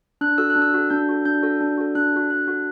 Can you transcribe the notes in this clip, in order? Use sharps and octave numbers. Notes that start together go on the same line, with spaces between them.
D4 F#6
F#4 A4 E6
F#6
D4
E6
F#4 A4
D4 G6
F#4 A4
D4 G6
F#4 A4
D4
F#4 A4
D4 F#6
F#4 A4
D4 F#6
F#4 A4